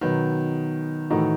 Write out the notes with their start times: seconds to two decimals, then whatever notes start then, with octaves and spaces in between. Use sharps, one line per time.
0.01 B2 D#3 F#3 B3 F#4
1.10 A2 D#3 E3 A3 D#4 F#4